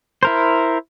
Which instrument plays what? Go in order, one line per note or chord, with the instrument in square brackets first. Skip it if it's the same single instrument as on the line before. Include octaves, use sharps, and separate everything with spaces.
[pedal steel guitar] E4 A#4 C5